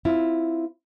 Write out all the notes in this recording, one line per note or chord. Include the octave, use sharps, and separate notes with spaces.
C4 E4 F4